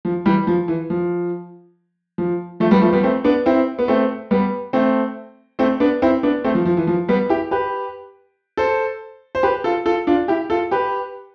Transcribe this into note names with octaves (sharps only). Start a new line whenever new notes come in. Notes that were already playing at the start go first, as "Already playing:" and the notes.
F3
E3 G3
F3
E3
F3
F3
F3 A3
G3 B3
F3 A3
G3 B3
A3 C4
B3 D4
C4 E4
B3
A3 C4
G3 B3
A3 C4
A3 C4
B3 D4
C4 E4
B3 D4
A3 C4
F3
F3
E3
F3
G3 B3
E4 G4
G4 B4
A4 C5
C5
G4 B4
F4 A4
F4 A4
D4 F4
E4 G4
F4 A4
G4 B4